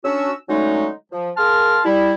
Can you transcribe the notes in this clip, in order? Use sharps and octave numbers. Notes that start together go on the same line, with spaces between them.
C#4 D4 F#4 E6
D3 F#3 G#3 A3 C#4 D#4
F3
A#3 G#4 A#4 A5 C6 F6
G3 E4